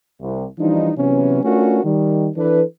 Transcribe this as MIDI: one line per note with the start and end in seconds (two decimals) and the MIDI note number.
0.21 0.45 36
0.59 0.90 52
0.59 0.90 53
0.59 0.90 55
0.59 0.90 62
0.59 0.90 63
0.97 1.39 48
0.97 1.39 52
0.97 1.39 54
0.97 1.39 59
0.97 1.39 61
1.43 1.82 57
1.43 1.82 61
1.43 1.82 62
1.43 1.82 65
1.43 1.82 66
1.43 1.82 70
1.84 2.28 51
1.84 2.28 55
2.36 2.62 52
2.36 2.62 62
2.36 2.62 69
2.36 2.62 71